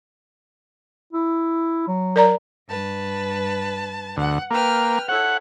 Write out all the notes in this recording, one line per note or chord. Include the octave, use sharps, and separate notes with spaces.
E4
F#3
A#4 D5 A#5
G2 B4 A5
D2 F#5
A#3 B4 G5 F6
E4 A4 C#5 F#5